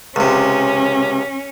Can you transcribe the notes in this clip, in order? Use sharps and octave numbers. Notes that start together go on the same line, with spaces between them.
C#2 C3 C#4